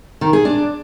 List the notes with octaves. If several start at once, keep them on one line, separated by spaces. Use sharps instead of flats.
D#3
G#4
D4